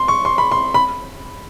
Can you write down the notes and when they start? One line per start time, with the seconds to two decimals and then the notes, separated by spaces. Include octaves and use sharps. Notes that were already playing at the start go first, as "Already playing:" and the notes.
Already playing: C6
0.08 C#6
0.25 C6
0.38 B5
0.52 C6
0.74 B5